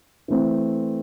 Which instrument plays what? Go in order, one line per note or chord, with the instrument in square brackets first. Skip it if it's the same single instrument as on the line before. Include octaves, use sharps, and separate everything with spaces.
[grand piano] E3 A3 C4